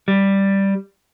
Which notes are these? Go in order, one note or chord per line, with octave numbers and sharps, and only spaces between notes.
G3